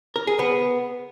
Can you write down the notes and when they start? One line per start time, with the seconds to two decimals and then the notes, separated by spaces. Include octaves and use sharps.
0.16 A#4
0.27 G#4
0.39 B3